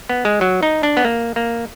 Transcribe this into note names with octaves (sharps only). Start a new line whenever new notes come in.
B3
G#3
F#3
D#4
D4
B3
A#3
A#3